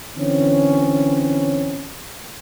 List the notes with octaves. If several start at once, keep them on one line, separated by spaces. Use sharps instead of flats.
D3 E3 C4 C#4